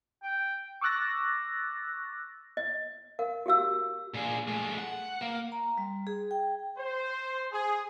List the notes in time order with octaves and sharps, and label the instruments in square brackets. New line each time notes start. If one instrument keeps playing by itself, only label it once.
[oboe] G5
[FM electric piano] C#6 D6 E6 F#6 A6 A#6
[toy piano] D#5
A#4 F5
F#4 G4 F5 E6
[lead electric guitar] A#2 G#4
G#3 A3
F#5
A#3
[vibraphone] A#5
G3
G#4
G5
[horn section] C5
G#4